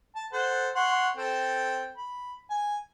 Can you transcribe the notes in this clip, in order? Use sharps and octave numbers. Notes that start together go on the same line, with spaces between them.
A5
A4 C5 F#5
C#5 F#5 C6
C4 A4 G5
B5
G#5